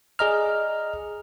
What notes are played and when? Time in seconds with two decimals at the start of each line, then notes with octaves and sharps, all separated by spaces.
0.19 G#4 D5 D#5 A#5 F6